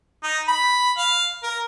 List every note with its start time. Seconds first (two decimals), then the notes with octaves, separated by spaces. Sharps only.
0.23 D#4
0.48 B5
0.98 F5
1.43 A#4